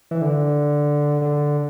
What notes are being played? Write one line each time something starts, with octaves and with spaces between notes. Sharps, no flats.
E3
D3
D3